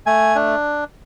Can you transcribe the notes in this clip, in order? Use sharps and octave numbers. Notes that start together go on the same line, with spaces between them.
A3 G#5
D4